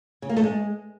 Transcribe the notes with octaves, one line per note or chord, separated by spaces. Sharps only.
C#3
A#3
A3
G#3